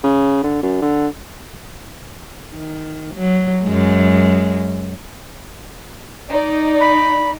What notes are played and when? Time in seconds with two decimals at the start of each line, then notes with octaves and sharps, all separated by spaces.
0.04 C#3
0.44 D3
0.63 F#2
0.82 D3
2.51 D#3
3.15 F#3
3.64 F#2 G#3
6.29 D#4 D5
6.81 B5